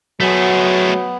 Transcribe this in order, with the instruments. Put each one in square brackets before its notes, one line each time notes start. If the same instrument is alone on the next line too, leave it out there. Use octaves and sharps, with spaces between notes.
[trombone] F#3 [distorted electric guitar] A3 G#4 [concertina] B3